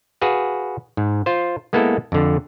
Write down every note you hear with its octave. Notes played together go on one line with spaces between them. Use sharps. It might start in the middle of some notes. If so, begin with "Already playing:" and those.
F#4 G#4 B4 F5
G#2
F4 C5
G#3 A#3 B3 E4 A4
F2 D3